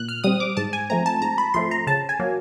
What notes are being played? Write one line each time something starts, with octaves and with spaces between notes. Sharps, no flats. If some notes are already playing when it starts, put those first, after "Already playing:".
Already playing: A#2 F#6
F6
G3 C4 D#6
D6
G#2 A5
G#5
F3 A3 C4 A#5
A5
G#2 A#5
B5
F3 A3 C4 C6
A#5
C#3 A5
G#5
F#3 A#3